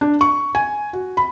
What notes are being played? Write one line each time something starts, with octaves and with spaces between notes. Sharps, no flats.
D4
C#6
G#5
F#4
B5